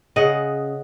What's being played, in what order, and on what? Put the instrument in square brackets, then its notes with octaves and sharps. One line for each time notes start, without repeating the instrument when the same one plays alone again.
[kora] C#3 D#5 F#5